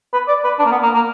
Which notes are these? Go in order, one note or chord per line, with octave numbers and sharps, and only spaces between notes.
B4
D5
B4
D4
A#3
B3
A#3
A#3